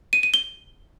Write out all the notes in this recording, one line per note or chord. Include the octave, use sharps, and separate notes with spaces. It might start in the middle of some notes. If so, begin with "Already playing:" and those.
D#7
D#7
G7